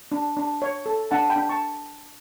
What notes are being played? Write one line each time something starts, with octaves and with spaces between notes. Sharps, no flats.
D4
D4
C#5
A4
D4 F#5 A5
G5 B5
D4
A5 C#6